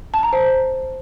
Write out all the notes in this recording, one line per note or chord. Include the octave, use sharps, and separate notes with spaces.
A5
A#5
C5